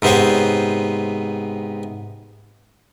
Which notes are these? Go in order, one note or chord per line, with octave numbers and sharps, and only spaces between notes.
G#2 C3 B3 C5 C#5